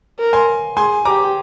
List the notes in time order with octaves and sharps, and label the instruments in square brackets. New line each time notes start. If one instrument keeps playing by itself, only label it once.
[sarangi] A#4
[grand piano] G#5 C6
[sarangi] G#4 [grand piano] G#5 C6
[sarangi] G4 [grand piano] A#5 D6